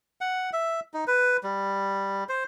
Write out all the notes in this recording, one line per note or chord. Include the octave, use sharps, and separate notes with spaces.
F#5
E5
D#4
B4
G3
C5